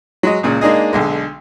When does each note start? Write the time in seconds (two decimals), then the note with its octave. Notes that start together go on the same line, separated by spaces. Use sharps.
0.23 F#3 G#3 D#5
0.43 C#2 A#2 C#3
0.61 G#3 A#3 D4 D#4 G#4 D#5
0.93 B1 D3 G#3